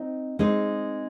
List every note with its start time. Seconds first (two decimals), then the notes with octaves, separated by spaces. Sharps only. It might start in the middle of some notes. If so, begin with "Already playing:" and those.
Already playing: C4 D#4
0.39 G#3 C4 D#4